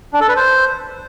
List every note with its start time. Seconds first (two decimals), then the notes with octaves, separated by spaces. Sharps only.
0.13 D4
0.21 A4
0.29 B4
0.36 C5